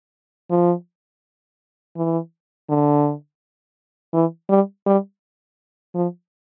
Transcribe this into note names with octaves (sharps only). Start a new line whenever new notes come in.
F3
E3
D3
E3
G3
G3
F3